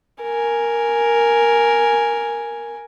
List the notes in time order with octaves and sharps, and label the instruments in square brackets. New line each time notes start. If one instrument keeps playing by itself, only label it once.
[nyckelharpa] A#4 G#5